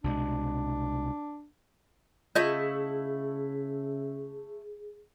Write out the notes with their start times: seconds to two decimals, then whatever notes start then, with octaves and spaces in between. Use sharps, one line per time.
0.04 C2 B2 G#3 D4
2.35 C#3 A3 E4 F4 G#4 D#5 G6